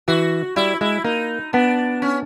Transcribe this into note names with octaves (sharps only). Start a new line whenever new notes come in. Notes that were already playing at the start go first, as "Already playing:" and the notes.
E3 F#4
G3 E4
G#3 E4
A#3 D#4
B3 D4
C#4